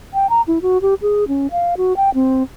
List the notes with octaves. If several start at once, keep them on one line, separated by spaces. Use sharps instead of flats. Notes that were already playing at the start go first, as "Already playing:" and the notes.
G5
A#5
E4
F#4
G4
G#4
C#4
F5
F#4
G5
C4